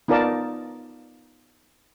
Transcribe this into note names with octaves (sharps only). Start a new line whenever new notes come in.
B3 D#4 F4 A#4 D5 A5